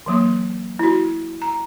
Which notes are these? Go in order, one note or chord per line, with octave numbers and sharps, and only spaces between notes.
E3 F#3 A#3
E4 F#4
A#5